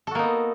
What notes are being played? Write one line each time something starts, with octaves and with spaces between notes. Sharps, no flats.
A#3 B3 D#4 F#4 A4